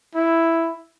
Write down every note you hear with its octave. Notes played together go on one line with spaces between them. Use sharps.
E4